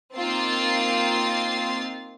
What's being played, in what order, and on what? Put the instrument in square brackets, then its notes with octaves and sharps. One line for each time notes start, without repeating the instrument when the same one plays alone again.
[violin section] A#3 C4 D#4 F4 A6 C7